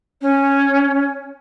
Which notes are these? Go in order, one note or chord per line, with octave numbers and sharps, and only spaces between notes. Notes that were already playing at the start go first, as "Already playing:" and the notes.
C#4